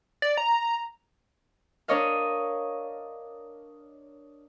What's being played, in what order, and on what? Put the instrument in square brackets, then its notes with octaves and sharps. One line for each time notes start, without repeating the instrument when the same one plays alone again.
[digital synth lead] D5
A#5
[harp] D4 A#4 C#5 D#5 F5